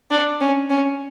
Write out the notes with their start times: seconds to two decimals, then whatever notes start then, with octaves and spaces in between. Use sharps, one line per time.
0.11 D4
0.41 C#4
0.70 C#4